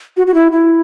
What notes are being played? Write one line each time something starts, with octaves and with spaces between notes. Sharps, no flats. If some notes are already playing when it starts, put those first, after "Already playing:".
F#4
F#4
E4
E4